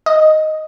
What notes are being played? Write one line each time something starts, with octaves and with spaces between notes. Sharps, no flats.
D#5